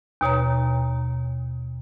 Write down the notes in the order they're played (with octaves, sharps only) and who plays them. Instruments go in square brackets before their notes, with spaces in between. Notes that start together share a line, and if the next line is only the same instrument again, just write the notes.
[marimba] D#2 B2 C#5 A#5